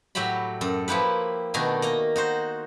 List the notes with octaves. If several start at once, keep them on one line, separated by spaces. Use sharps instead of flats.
A2 F#3 G4 E5 B5
F#2 A4
F3 A#3 E4 G4 B4
B2 D#3 A3 D4 D#4 G#5
A#3 D#5 A#5
D#4 F#4 C5